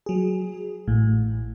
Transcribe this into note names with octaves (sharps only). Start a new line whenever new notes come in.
F#3 G#4
A1 A2